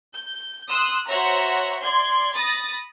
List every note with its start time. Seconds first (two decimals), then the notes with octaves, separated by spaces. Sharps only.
0.11 G6
0.68 C6 D#6 E6 F#6
1.07 F#4 C5 C#5 E5 F#5 A#5
1.81 D5 C6 G#6
2.34 B5 D#6 A6 A#6